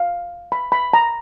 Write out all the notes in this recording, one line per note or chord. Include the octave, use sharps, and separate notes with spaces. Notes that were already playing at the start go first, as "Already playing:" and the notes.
Already playing: F5
B5
B5
A#5